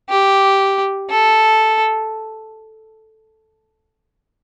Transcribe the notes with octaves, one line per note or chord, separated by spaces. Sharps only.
G4
A4